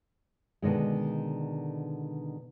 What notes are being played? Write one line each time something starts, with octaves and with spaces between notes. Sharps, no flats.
B2 D3 D#3 G#3